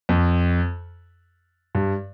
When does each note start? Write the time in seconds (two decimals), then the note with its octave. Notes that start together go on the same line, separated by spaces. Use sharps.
0.09 F2
1.75 G2